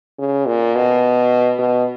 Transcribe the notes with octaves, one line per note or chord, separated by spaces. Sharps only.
C#3
A#2
B2
B2